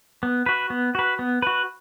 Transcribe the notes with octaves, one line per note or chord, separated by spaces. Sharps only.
B3
F#4 B4
B3
F#4 B4
B3
F#4 B4